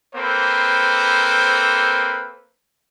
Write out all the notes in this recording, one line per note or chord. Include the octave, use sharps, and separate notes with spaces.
A#3 C4 A4 B4 C5